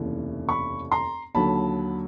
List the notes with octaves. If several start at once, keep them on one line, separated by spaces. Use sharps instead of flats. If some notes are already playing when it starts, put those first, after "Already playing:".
Already playing: F1 D#2 C#3 E3
B5 C#6
A#5 C6
D#2 D3 F#3 A5 B5